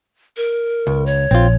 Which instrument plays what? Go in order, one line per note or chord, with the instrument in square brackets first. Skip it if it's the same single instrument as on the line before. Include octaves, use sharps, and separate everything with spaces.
[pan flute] A#4
[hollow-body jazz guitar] C#2
[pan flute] C#5
[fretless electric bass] A#1 [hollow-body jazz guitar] C4 F4